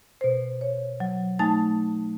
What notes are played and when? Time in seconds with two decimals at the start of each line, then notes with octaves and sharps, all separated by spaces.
0.21 B2 C5
0.61 C#5
1.00 F#3
1.39 A3 D#4 G#5 A5 A6